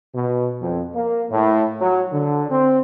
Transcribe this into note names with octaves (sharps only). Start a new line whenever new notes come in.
B2
F2
A#3
A2
F#3
D3
C4